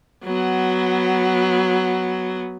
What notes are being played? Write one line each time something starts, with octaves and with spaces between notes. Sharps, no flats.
F#3 B3